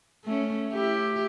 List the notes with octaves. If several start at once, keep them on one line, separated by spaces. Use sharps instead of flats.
A3 C#4
E4 G4